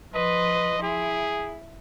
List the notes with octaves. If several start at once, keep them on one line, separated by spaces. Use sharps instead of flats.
F3 B4 D#5 C6
E4 G#4